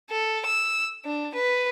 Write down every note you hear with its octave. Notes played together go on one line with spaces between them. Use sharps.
A4
E6
D4
B4